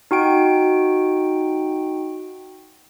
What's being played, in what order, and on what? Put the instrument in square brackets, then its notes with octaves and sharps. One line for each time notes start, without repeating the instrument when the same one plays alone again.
[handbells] D#4 F#4 G5 D7